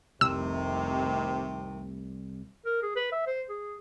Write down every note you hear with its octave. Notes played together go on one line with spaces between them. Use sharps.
F1 C2 C3 D#3 A3 E6
A#4
G#4
B4
E5
C5
G#4